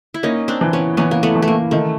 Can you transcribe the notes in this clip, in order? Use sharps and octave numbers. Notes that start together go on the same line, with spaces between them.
E4
A#3 C#4 D#4
C4 D4
E3
B3 C#4
E3 B3 C#4
A#3
A3 B3
E3
A3
A#3
D#3 A3